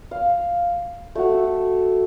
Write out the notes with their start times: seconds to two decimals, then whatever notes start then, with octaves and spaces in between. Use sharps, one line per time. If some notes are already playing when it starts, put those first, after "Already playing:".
0.11 F5
1.15 A3 F#4
1.34 A4